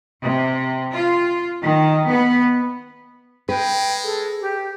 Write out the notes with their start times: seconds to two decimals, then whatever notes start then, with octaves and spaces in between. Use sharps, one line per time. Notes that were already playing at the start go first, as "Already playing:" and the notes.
0.22 C3
0.93 F4
1.63 D#3
2.09 B3
3.49 G#3 B4 G5
4.04 G#4 A4
4.41 G4